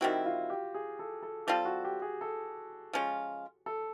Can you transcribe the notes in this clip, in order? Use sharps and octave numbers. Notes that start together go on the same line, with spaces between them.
D#3 G3 C4 E4 F#4
F4
G4
G#4
A4
A4
G3 C4 F4 G4 A4
F#4
G4
G#4
A4
F3 G#3 C#4 F4
A4